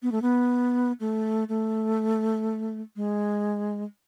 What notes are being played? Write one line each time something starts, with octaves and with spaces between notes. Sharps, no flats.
B3
A3
B3
A3
A3
G#3